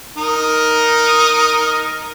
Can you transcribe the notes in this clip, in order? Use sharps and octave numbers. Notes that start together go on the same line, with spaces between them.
D#4 A#4